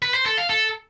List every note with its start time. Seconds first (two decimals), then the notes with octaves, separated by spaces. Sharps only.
0.02 B4
0.14 C5
0.26 A4
0.38 F5
0.49 A4